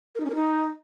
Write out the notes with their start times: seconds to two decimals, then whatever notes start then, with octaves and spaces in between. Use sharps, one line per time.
0.15 A#4
0.20 D#4
0.25 C#4
0.30 A#4
0.35 D#4